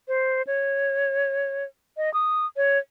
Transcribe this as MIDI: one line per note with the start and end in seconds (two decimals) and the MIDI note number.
0.08 0.42 72
0.47 1.64 73
1.97 2.12 75
2.14 2.46 87
2.57 2.78 73